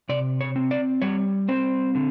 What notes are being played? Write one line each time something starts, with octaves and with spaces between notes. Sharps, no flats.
C3 D5
C#5
C4
D5
G3 C#5
C4 C5
D3